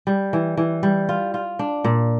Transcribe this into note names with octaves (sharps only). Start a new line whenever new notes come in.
G3
E3
E3
G3
F4
F4
D4
A#2